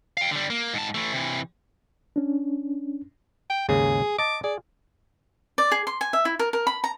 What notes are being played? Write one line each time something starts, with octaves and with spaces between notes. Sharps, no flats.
F5 G5
D3 G3
A#3
G#2 A5
E3 A3
C3 E3
C#4 D4
G5
D#2 G#2 C#3 G#4
D#5 A5 D6
G#4 D5
D5
G#4
C6
G#5
E5
E4
A#4
A#4
B5
A#5